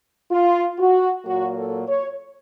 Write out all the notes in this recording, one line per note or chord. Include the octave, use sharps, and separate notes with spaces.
F4
F#4
A#2 F#3 A#3 F#4
A4
C#5